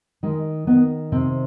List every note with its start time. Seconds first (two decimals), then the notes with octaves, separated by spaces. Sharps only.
0.23 D#3 G#3
0.67 D#3 B3
1.12 C3 C4